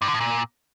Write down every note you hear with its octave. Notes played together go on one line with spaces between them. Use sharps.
G2
D3
A2
A#2